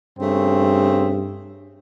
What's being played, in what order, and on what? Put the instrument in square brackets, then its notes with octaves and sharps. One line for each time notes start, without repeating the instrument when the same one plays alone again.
[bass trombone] G2 [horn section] C#3 A3 C4